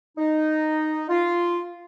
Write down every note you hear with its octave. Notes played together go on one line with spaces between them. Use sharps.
D#4
F4